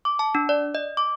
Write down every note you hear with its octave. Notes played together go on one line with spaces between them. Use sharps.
D6
A5
D4
D5
D#5
D6